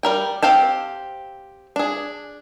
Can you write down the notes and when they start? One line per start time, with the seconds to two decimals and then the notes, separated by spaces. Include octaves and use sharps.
0.03 G3 A#4 G5
0.43 C4 G4 F5 G5 A5
1.76 D4 G#4